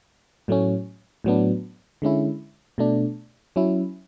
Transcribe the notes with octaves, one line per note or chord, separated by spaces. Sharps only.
A2 F#3 A3 C#4
A2 F#3 B3 D4
D3 G#3 C#4 E4
B2 A3 D4
F#3 C#4 E4